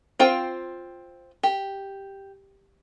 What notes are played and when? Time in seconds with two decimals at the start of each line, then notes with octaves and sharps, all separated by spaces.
0.19 C4 F4 C5 G5
1.43 G4